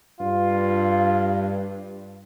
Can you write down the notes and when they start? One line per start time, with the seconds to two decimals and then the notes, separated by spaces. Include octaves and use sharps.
0.21 G2 F4